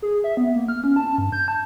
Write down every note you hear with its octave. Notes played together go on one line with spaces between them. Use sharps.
G#4
E5
B3
A#3
F6
C#4
A5
G2
G6
A5